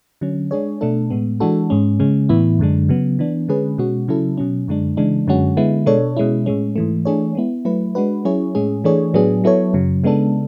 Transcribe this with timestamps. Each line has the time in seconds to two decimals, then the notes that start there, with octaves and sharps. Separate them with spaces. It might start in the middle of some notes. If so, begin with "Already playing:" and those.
0.21 D3 F#3 C#4
0.51 G#3 D4 G#4 C#5
0.81 B2 A3 D4 A4
1.10 A2 G#3 B3
1.40 E3 G#3 D4 F#4 A4
1.70 G#2 G#3 C#4
2.00 C#3 G#3 C#4
2.29 A2 E3 B3 E4
2.59 F#2 D3 G#3 D4
2.89 C#3 F#3 B3
3.19 E3 B3 D4
3.48 D3 G#3 C#4 G#4 B4
3.78 B2 G#3 C#4 F#4
4.08 C#3 F#3 C#4 E4 A4
4.37 B2 F#3 C#4
4.68 F#2 D3 G#3 D4
4.97 C#3 E3 G#3 D4
5.27 F#2 D3 G#3 C#4 F#4
5.57 D3 G#3 B3 E4
5.86 B2 G#3 D4 A4 C#5
6.17 B2 G#3 C#4 E4
6.46 A2 G#3 C#4
6.76 G#2 E3 A3
7.05 E3 A3 D4 G#4 C#5
7.35 G#3 B3 E4
7.65 F#3 A3 E4 B4
7.95 G#3 D4 F#4 B4
8.25 F#3 C#4 E4 G#4 C#5
8.55 A2 G#3 C#4 G#4
8.84 E3 A3 D4 G#4 C#5
9.14 A2 F#3 B3 D4 G#4
9.44 F#3 B3 E4 A4 C#5
9.73 F#2 C#3 F#3
10.04 C#3 G#3 B3 D4 A4